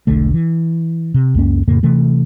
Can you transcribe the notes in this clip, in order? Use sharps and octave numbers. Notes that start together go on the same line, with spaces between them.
E1 B1 D3 A3
E3
C3
C#2 F#2 A#3 C#4
F2 A2 C#3 A#3
C3 E3 A3